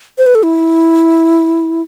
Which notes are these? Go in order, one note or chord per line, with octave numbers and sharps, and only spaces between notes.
C5
B4
A4
E4